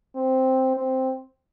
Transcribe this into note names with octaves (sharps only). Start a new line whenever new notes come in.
C4
C4